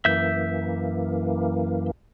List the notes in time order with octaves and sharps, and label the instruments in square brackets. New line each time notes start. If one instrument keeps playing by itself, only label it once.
[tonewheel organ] F#2 E3 A#3 [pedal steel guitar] E5 G6